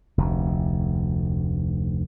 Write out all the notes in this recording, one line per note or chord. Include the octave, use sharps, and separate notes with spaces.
F1 D2